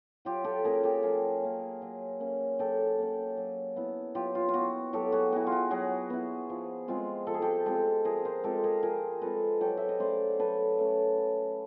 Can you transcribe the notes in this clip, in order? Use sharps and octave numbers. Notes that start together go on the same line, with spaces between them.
F#3 F4 G4
G4 A4
A#3 C#4 G#4 A#4
G4 A4
F#3 G#4 A#4
A#3 C#4
F#3
A#3 C#4
F#3 G4 A4
A#3 C#4
F#3
B3 E4
F#3 F4 G4
F4
F4
B3 E4 F#4
F#3 G4 A4
F#4 G#4
B3 E4 F#4
F4
F#4
F#3 F#4 G#4
B3 E4
F3
G#3 C4 F4
F3 A4
G#4
G4 A4
G#3 C4 F4 G4 A4
F3 G#4 A#4
A#4 C5
G#3 C4 F4 G4 A4
G#4 A#4
F3 G#4 A#4
G#3 C4 F4 A4 B4
F#3 G4 A4
E5
D#5
A3 C#4 C5 D5
F#3 A4 B4
A3 C#4
F#3